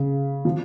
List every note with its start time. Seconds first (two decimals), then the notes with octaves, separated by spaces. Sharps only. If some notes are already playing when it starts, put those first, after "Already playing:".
Already playing: C#3
0.45 F3